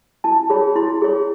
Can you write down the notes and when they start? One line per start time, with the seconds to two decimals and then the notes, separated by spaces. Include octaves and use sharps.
0.24 E4 A5
0.50 G#4 C#5 B5
0.76 E4 C6
1.02 G#4 C#5